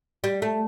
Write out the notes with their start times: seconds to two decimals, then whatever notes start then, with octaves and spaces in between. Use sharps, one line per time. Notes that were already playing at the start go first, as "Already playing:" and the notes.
0.24 G3
0.42 A3